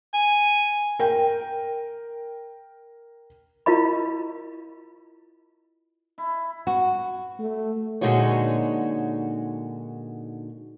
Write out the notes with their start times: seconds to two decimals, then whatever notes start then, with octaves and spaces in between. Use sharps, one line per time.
0.14 G#5
0.99 A#4 G5
3.66 E4 F4 A#4 D#5 B5
6.18 E4
6.67 F#4
7.39 A3
8.01 A#2 D3 G#3 D#4 F#4 C#5